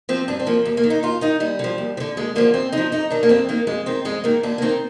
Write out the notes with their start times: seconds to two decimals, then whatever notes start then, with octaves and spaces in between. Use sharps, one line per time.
0.09 F3 C4
0.28 G2 D4
0.40 C4
0.47 F3 A#3
0.65 D#2
0.77 A#3
0.84 D#3
0.90 D#4
1.03 D#2 F4
1.21 D#3 D#4
1.40 D#2 G3
1.59 D3
1.64 F3
1.78 D#2
1.97 F3
2.00 D3
2.17 D#2 G#3
2.35 D3 F3 A#3
2.53 D#2 C4
2.72 D3 D#4
2.77 F3
2.92 F2 D#4
3.10 D#3 D4
3.23 A#3
3.29 F2 C4
3.49 D#3 A#3
3.67 F2 G#3
3.86 D#3 C4
4.05 F2 G#3
4.24 D#3 A#3
4.43 D#2 D4
4.58 A#3
4.62 D#3 C4